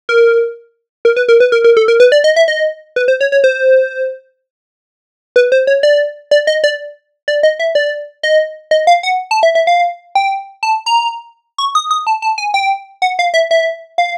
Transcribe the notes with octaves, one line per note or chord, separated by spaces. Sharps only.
A#4
A#4
B4
A#4
B4
A#4
A#4
A4
A#4
B4
D5
D#5
E5
D#5
B4
C5
C#5
C#5
C5
B4
C5
C#5
D5
D5
D#5
D5
D5
D#5
E5
D5
D#5
D#5
F5
F#5
A5
E5
E5
F5
G5
A5
A#5
C#6
D#6
D#6
A5
A5
G#5
G5
F#5
F5
E5
E5
F5